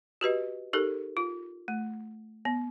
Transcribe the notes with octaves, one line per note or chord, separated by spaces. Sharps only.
F#4 G4 B4 D#5
D#4 G4 A4 A#4
F4
A3
B3